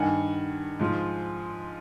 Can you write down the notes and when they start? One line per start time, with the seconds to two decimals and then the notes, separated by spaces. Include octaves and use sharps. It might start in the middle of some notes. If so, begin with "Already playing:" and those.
Already playing: G2 D#3 F#5 G#5
0.79 G#2 F3